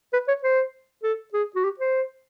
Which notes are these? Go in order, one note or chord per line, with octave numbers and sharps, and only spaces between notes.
B4
C#5
C5
A4
G#4
F#4
G4
C5